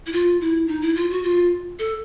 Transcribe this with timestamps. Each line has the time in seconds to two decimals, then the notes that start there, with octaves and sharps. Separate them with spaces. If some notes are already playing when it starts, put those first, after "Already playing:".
0.06 E4
0.12 F4
0.41 E4
0.68 D#4
0.82 E4
0.95 F4
1.10 F#4
1.23 F4
1.79 A4